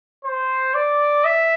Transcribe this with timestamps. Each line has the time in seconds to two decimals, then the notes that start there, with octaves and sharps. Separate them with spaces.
0.24 C5
0.74 D5
1.24 E5